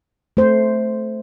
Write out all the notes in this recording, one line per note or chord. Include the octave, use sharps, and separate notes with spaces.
A3 C5